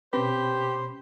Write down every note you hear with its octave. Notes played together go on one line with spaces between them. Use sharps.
B2 C4 C#4 G4 B4 C5 B5